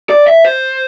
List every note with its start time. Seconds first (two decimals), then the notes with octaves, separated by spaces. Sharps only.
0.10 D5
0.27 E5
0.44 C5